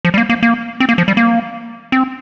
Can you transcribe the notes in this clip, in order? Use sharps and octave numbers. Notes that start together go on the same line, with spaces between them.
F3
G3
A#3
A#3
A#3
C4
A#3
F3
G3
A#3
C4